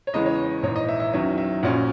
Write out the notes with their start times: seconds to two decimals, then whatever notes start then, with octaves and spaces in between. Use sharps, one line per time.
0.07 C#5
0.13 E2 C#3 E3 G#3 D#5
0.26 C#5
0.63 A#1 G#2 E3 C#5
0.76 D#5
0.89 E5
1.00 E5
1.13 E2 D#3 F#3 C#4 E5
1.38 E5
1.63 A#1 A#2 F#3 C#4 F#5